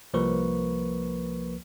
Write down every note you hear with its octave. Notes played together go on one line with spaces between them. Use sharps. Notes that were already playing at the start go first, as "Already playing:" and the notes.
C2 F3 A#3 A#4 B4 C#6